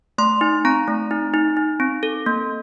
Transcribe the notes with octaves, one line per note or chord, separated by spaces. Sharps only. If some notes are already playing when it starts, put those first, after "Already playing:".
A3 C6
D#4
C4 A#5
A3
D#4
D#4
D#4
C4
A4
A#3